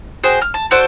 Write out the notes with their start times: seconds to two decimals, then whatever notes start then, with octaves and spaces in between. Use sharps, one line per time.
0.23 F#4 G#4 C5 G5
0.42 F6
0.54 A5
0.71 F#4 A4 C5 D5